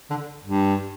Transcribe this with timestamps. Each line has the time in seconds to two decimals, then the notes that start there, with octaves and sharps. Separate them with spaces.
0.10 D3
0.44 G2